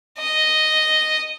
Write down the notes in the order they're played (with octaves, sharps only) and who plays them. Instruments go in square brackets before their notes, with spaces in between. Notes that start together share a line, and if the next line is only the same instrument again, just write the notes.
[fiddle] D#5